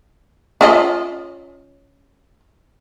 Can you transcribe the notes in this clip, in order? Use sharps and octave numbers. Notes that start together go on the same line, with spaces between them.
C#4 F4 D#5